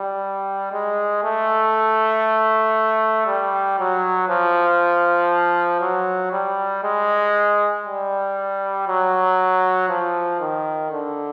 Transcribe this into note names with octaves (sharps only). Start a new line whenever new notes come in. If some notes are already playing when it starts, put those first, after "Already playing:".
Already playing: G3
G#3
A3
G3
F#3
F3
F#3
G3
G#3
G3
F#3
F3
D#3
D3